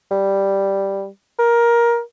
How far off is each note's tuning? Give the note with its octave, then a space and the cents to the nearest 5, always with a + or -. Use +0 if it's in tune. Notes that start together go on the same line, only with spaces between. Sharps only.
G3 +0
A#4 +15